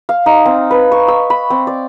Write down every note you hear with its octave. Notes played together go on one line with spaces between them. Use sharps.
F5
D#4
C4
B4
C#6
E6
B5
C4
D5